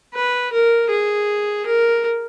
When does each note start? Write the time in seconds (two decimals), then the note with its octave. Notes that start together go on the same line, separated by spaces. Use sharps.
0.14 B4
0.52 A#4
0.90 G#4
1.66 A#4